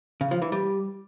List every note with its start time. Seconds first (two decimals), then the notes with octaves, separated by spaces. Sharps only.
0.21 C#3
0.31 F3
0.42 E3
0.52 G3